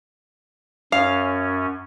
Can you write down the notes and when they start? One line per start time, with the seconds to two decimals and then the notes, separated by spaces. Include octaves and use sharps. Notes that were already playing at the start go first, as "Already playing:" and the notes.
0.92 F#2 C#4 F5